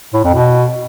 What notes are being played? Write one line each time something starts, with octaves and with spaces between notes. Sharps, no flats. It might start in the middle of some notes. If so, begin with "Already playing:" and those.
A2
F2
B2